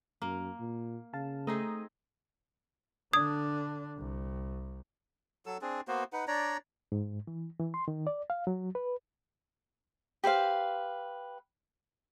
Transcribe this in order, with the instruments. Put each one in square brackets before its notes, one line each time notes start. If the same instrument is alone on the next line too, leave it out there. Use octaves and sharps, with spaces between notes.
[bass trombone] F#2 [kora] A#3
[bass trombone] A#2
[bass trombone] C#3 [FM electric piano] F5 A5
[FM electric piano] A3 A#5 D#6 [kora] C4 D#4 G#4
[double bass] D3 D4 [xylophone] D#6 G#6
[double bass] C2
[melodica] F#3 A4 E6
C4 D4 G#4
A#3 B3 F#4 C5
D#4 B4 F#5
D4 C#5 D5 A#5
[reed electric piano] G#2
E3
E3
C6
D#3
D5
F5
F#3
B4
[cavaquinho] G4 B4 C5 F5